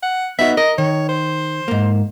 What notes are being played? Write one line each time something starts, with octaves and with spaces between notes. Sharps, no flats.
F#5
B3 D#4 F#4 E5
A#4 D#5
D#3 C#5
C5
G#2 A#3